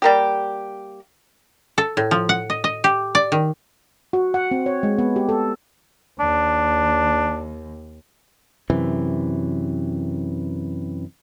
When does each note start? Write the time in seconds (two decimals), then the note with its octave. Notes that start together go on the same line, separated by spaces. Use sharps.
0.02 G3 A#3 G4
1.78 A4
1.97 A2
2.11 F3
2.29 F#5
2.50 D#5
2.64 D#5
2.84 G4
3.15 D5
3.32 D#3
4.13 F#4
4.34 F#5
4.51 C4
4.66 C#5
4.83 G#3
4.99 B3
5.16 G4
5.29 A4
6.20 D#2 D4
8.70 F#2 C3 E3